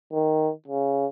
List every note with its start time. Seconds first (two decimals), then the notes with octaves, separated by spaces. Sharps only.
0.12 D#3
0.68 C#3